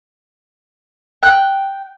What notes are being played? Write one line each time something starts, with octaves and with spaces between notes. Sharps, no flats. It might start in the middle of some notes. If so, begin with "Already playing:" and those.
G5 F#6